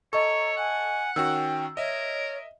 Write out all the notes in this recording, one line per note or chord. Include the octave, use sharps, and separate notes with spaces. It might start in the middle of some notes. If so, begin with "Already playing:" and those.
A4 C#5 D#5 A#5 C#6
F#5 G#5
D#3 C#4 F#4 G5 E6
A#4 C#5 D#5 E5